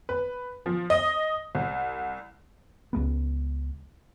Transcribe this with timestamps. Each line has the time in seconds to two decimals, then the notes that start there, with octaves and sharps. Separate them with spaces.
0.09 B4
0.66 F3
0.90 D#5
1.55 C2
2.93 C#2 G#3 B3